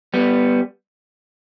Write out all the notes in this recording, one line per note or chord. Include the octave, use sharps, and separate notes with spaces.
G3 B3